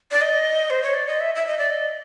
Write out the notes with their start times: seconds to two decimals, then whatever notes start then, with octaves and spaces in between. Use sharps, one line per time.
0.12 D5
0.21 D#5
0.70 C5
0.82 C#5
0.94 D5
1.07 D#5
1.20 E5
1.35 E5
1.47 D#5
1.58 D5
1.70 D#5